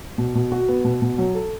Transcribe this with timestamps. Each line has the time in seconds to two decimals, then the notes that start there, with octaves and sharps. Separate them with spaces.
0.18 B2
0.35 B2
0.52 F#4
0.68 B3
0.84 B2
1.02 B2
1.18 F#3
1.35 A4